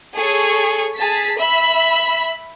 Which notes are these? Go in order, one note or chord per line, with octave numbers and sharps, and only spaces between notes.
G#4 A4 C#5 C#6
G#4 A5 B6
E5 B5